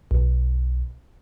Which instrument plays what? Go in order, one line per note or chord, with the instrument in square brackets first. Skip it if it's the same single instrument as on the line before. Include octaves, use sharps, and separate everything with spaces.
[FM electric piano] B1